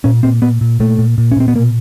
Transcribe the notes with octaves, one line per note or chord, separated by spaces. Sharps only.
A#2 C#4
A#2 C4
A#2 B3
A#2
A#2 A3
A#2
A#2
C#4
A#2 C4
B3
B2 A#3